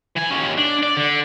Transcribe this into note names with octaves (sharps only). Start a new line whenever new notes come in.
E3 G#5
D#2 C#4
D4
D5
D3